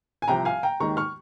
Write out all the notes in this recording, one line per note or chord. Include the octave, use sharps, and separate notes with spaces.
G#5
C2 C3 F3 G5 A#5
F5 G#5
G5 A#5
D#2 D#3 G#3 A#5 C#6
C#6 F6